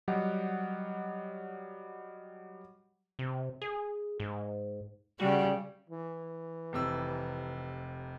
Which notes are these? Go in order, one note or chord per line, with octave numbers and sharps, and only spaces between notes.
F#3 G3 G4 D#5 F#5
C3
G#4
G#2
C#3 G3 F#4
E3
F1 C3 E6